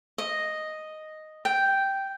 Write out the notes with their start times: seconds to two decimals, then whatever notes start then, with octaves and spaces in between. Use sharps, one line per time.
0.18 D#5
1.45 G5